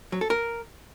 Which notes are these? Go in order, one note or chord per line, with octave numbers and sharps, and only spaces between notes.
F#3
A4
A#4